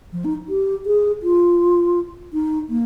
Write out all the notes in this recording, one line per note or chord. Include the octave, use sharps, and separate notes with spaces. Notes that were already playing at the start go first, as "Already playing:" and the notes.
F3
D#4
G4
G#4
F4
D#4
A#3